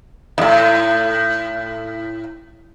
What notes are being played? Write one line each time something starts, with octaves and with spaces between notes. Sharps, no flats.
D#2 A2